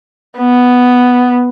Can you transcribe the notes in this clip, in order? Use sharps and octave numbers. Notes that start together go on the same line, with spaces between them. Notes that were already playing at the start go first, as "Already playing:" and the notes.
B3